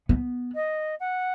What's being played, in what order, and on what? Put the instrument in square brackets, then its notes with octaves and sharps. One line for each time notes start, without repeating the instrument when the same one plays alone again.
[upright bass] B3
[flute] D#5
F#5